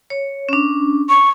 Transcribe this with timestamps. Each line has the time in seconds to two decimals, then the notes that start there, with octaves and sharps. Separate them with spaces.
0.10 C#5
0.49 C#4 D4
1.09 C#6